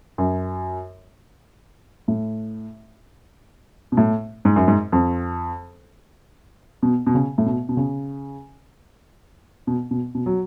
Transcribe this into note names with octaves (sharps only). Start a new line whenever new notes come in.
F#2
A2
B2
A2
G#2
F#2
G#2
F2
B2
B2
C#3
A2
B2
B2
C#3
B2
B2
B2
F#3